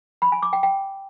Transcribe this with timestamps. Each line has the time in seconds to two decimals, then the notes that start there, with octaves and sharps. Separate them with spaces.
0.22 B5
0.32 G#5
0.42 D6
0.53 G5
0.63 G5